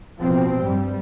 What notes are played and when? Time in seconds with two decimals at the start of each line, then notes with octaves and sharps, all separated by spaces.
0.20 B2 F3 C4
0.61 G2 G3